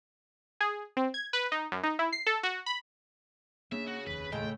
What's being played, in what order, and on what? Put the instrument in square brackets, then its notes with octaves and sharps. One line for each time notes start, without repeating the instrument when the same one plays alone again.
[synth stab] G#4
C4
G#6
B4
D#4
F#2
D#4
E4
C7
A4
F#4
B5
[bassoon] C#3 [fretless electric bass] A#3 C4 D4 [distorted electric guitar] E5
[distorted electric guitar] F#4
[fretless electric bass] F1 D#2 [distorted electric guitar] B4
[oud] A2 C#3 A3 [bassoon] G#3 [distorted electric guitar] G5